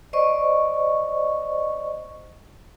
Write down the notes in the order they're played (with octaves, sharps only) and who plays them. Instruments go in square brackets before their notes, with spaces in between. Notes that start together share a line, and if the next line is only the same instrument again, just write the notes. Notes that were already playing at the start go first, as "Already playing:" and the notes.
[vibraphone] C5 D5 D#5 C#6